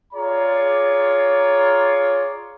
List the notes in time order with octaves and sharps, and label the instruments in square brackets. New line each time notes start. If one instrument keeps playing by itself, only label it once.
[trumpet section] F4 G#4 C#5 D5 A#5